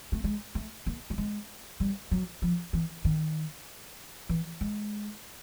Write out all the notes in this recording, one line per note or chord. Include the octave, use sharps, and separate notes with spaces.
A3
G#3
A3
A#3
A3
G#3
G3
F#3
F3
E3
D#3
E3
G#3